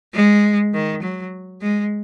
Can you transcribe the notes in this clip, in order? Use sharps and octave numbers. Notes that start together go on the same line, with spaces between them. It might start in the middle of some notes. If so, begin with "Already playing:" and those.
G#3
D#3
F#3
G#3